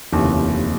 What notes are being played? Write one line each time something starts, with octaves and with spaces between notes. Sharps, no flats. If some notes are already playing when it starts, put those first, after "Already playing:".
F1 D#2 C#3 E3